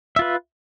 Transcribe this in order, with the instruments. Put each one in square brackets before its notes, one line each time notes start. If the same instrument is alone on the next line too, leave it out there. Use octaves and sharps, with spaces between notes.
[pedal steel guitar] E5
F4
B4